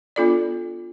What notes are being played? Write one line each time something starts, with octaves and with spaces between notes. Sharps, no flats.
B3 D4 F4 A4 D5